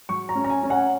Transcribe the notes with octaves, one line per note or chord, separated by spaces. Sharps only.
F#3 C#6
A#5
C#4
A#5
G#5
C#4
F#5